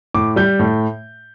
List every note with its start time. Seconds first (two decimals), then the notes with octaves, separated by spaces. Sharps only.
0.14 A2 D6
0.36 G3 G6
0.59 A2